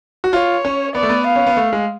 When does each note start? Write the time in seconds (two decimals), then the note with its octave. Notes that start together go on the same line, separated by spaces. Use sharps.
0.24 F#4
0.33 F4 C#5
0.65 C#4
0.95 B3 D5
1.03 A3
1.09 B3
1.26 F5
1.36 C#4
1.46 B3
1.57 A3
1.73 G#3